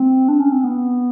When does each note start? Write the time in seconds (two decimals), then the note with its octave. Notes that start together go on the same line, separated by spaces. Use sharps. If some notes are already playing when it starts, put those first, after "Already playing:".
Already playing: C4
0.28 D4
0.40 C#4
0.52 C4
0.64 B3